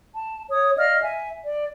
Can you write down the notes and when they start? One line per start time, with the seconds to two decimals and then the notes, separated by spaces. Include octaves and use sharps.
0.15 A5
0.50 C#5 D#6
0.77 D5 D#5 F5 F6
1.02 E5 G#5
1.45 D5